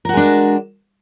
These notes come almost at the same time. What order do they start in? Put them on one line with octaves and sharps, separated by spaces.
A#4 F#4 G#3 D4